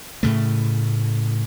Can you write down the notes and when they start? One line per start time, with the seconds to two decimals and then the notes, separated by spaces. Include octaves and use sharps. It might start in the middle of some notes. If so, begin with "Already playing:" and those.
0.23 A2 C#3 A3